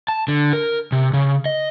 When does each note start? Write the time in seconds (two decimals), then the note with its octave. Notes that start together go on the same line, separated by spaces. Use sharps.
0.08 A5
0.28 D3
0.53 A#4
0.92 C3
1.13 C#3
1.46 D#5